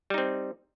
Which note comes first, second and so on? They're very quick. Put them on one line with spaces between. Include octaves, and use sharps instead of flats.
G3 D#4 C4